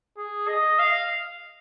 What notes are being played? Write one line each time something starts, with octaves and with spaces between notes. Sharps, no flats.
G#4
D#5
F5